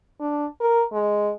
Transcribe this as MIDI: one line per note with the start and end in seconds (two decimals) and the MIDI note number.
0.21 0.46 62
0.61 0.84 70
0.93 1.32 56